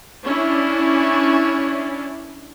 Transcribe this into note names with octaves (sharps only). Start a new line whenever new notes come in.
C#4 D4 E4